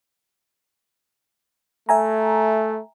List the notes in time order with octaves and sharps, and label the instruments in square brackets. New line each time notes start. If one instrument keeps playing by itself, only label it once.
[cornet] A3 [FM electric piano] E5 G#5 A#5